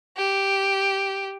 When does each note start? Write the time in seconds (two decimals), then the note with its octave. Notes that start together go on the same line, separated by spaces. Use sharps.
0.17 G4